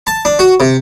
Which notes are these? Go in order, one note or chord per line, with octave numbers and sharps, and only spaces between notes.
A5
D4
F#4
C3